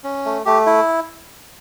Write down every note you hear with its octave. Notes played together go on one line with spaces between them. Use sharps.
C#4
A3
A3 G4
E4